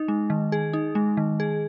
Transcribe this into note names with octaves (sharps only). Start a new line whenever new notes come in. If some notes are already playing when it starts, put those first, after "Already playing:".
Already playing: D#4
G#3
D#3
G#4
D#4
G#3
D#3
G#4